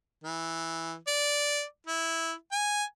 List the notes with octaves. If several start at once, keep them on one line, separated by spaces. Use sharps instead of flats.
E3
D5
E4
G#5